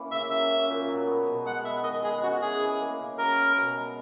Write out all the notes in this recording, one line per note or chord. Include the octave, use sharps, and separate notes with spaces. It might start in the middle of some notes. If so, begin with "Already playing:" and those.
Already playing: E3 A#3 C#4
C#3 E5
F#3 E5
C#4
A#2
F#3
B3
B2
G#3 F#5
B3 E5
D#3 D#5
G#3 G#4
C#4 F#4
E3 G#4
E3
A#3
C#3
F#3 A#4
B3
B2
G#3